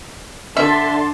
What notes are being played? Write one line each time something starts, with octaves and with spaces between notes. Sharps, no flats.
D3 E5 A5 C6